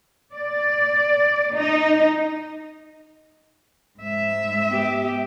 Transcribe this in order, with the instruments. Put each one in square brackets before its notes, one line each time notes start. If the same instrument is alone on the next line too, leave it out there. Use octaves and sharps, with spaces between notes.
[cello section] D5
D#4
[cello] G#2 E5
[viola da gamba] B3 G4